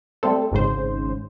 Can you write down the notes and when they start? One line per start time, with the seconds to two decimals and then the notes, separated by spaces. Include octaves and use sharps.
0.23 G3 A3 C4 A4
0.51 G#1 G#2 C#3 C5